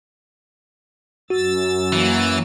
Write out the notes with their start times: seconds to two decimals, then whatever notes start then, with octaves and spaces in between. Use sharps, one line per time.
1.30 F#2 F#4 E6 A6
1.93 E3 F#3 A#3